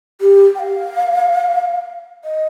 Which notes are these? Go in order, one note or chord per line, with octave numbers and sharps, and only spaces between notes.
G4
G5
F5
D#5